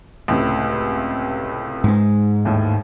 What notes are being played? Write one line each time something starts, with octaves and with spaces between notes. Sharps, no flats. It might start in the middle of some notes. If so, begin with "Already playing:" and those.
C#2 A2 C3
G#2 G#3
D#2 A2